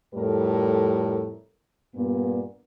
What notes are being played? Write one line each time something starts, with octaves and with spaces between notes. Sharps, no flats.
F2 A2 G3 A4 A#4
G2 A#2 B3